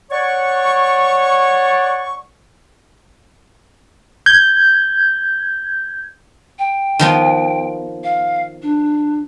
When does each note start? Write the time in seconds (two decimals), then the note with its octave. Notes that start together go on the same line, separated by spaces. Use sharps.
0.11 C#5 D5 F#5 C#6
4.26 G6 G#6
6.59 G5
6.99 D#3 F3 B3
8.04 F5
8.62 D4